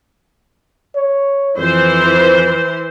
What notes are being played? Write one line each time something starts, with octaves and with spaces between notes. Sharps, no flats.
C#5
F2 E3 C5